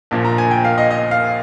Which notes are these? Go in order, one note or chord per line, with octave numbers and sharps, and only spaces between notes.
A#1 A#2 F3
A#5
G#5
G5
F5
D#5
D#5
F5